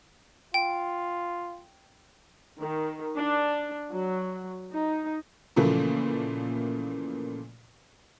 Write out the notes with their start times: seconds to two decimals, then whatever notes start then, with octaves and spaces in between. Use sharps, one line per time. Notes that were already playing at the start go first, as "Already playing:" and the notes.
0.54 F4 G5
2.60 D#3
3.16 D4
3.90 F#3
4.72 D#4
5.56 A#2 C#3 E3 F3 A3 A#3